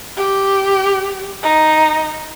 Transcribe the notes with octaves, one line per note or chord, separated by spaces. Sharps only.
G4
D#4